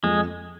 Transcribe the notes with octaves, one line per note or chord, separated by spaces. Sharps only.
F2 F3 G#3